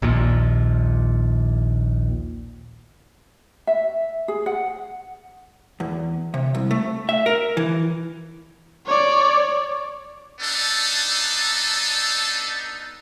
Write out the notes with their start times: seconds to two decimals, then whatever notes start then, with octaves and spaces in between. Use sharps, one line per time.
0.02 A#1 D#2 A#2
3.67 E5
4.28 G#4
4.46 F#5
5.80 E2
6.34 C3
6.55 C2
6.71 A3
7.09 E5
7.26 A#4
7.57 E3
8.86 C#5 D5
10.40 B3 D4 D#4 A4